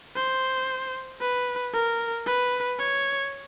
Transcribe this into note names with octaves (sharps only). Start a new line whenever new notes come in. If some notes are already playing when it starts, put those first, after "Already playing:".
C5
B4
A#4
B4
C#5